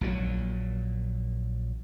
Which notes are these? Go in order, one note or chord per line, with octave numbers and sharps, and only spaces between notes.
A#1 A#2 F#3